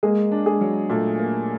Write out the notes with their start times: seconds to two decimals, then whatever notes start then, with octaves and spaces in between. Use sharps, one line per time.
0.03 G#3 A#3 G#4
0.32 D4
0.46 G#3 G#4
0.61 F#3
0.89 A#2 A3 A4
1.19 A#3